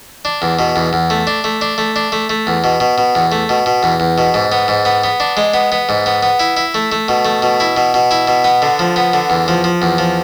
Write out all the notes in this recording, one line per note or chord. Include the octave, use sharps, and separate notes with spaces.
D4
E2
B2
E2
E2
A3
D4
A3
D4
A3
D4
A3
A3
E2
B2
B2
B2
E2
A3
B2
B2
E2
E2
B2
G#2
B3
G#2
B3
B3
D4
G#3
B3
B3
G#2
B3
B3
E4
E4
A3
A3
B2
A3
B2
E4
B2
B2
E4
B2
B3
D3
F3
B3
D3
E2
F3
F3
E2
F3